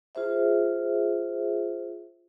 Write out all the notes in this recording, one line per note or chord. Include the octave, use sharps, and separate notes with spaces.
F4 G#4 C5 E5